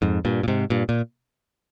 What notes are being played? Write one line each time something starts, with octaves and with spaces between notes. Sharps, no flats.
F2 G#2
G2 A#2
A#2
G#2 C3
G2 A#2
A#2